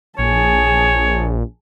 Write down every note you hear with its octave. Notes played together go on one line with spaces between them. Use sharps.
A#1 G#4 C#5 A5